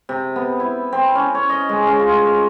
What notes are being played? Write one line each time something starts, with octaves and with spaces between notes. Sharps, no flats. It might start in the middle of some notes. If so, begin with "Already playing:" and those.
C3
B3
E4
C4
C#4
C#5
D#5
G#3
C#4
F4
C#5